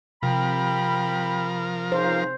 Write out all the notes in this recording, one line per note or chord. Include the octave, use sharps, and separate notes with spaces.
C3 F3 A#4 G5 B5
C#2 D#4 C5 F5